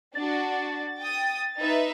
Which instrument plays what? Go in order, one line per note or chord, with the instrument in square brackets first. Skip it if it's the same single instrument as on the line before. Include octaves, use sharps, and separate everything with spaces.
[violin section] D4 F#4 [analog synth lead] A6
[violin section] G5 D#6
D#4 B4 E5